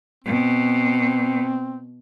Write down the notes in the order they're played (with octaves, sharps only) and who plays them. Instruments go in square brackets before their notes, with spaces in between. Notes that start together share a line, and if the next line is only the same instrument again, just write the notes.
[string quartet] B2 [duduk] C4